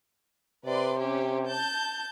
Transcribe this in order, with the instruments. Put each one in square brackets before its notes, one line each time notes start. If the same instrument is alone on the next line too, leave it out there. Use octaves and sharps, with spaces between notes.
[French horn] C3 [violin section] B4 D5 C6
[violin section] C#4 G4 C5
A5 G6